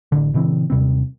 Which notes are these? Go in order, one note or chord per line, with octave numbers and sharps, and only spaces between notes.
A1 D3
A#2 C#3 E3 C4
D#2 C3 G3 C4